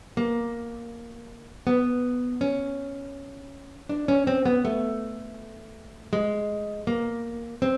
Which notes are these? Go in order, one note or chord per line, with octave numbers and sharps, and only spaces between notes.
A#3
B3
C#4
D4
C#4
C4
B3
A3
G#3
A#3
C4